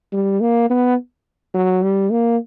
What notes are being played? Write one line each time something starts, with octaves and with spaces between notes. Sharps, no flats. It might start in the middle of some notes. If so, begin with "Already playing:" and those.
G3
A#3
B3
F#3
G3
A#3